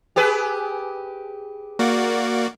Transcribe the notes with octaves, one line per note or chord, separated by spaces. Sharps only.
G4 G#4 B4
A#3 F#4 D5